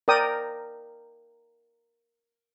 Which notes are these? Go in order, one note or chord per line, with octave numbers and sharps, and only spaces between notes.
A#4 D5 G5 D#6